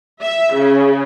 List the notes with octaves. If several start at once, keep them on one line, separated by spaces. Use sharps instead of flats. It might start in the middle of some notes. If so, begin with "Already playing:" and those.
E5
C#3